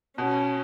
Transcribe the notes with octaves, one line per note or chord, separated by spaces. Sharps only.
B2 C#4